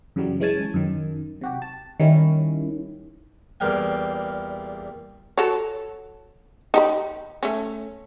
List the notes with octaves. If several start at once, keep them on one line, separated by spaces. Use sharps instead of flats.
F#2 C#3 E3 F#3 G3
E3 G#3 C#4 G#5 A5
F#2 D#3
C3 F#4 G4
A5
D#3 G3 C#4 E4
E2 A#2 G3 F5 G5
F#4 A4 C#5
D#4 G4 B5
A3 C#4